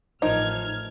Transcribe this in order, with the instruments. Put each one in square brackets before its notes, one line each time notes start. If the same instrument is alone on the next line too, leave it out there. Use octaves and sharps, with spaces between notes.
[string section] A1 F6 G#6 [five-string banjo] D#3 F3 D#4